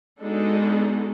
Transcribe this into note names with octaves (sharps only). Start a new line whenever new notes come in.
G#3 B3 D4 D#4 F#4 A4